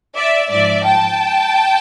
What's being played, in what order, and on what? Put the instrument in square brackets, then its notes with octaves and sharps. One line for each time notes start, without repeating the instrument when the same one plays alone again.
[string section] D5 E5
G#2 F3 D5 E5
G5 A5